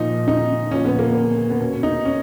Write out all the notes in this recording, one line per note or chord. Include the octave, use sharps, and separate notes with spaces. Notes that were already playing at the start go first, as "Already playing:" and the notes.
Already playing: A#2 F3 D#4
D#4
A#2 F3 C#4
B3
A#3
B3
B3
B2 C#4
D#4
C#4